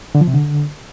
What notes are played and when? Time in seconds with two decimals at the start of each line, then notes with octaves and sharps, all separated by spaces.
0.15 D3
0.21 F3
0.27 C3
0.34 D3